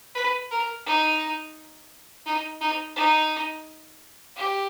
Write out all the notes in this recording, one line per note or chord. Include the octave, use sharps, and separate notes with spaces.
B4
A#4
D#4
D#4
D#4
D#4
G4